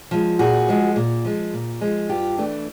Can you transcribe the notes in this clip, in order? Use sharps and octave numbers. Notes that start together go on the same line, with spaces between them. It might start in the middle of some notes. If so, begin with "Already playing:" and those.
F3 G#3
A#2 F#4 G#4
F3 G#3
A#2
F3 G#3
A#2
F3 G#3
G2 F4 G4
E3 A3 D4